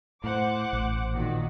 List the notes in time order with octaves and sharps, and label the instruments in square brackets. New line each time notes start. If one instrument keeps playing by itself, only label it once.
[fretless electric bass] A2 [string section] C5 F#5 D6
[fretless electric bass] A1
[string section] A#2 D#3 F#4